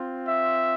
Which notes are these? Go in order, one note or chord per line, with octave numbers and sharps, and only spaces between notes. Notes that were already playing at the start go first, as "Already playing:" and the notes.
Already playing: C4 F4
E5